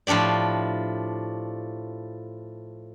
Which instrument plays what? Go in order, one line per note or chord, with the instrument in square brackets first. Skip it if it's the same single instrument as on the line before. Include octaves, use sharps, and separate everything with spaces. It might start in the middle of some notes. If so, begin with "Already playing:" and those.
[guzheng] A2 F3 D4 G4 D5